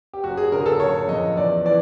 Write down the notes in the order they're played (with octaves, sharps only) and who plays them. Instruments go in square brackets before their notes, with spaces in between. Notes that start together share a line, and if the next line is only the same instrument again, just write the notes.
[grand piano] G4
F#1 F#4
G#4
D3 A#4
G#4
A4
F#1 C#5
F2 D#5
E2 D5
E3 D5